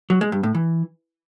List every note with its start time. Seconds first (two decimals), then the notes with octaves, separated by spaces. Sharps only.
0.10 F#3
0.21 G#3
0.32 G2
0.43 A2
0.55 E3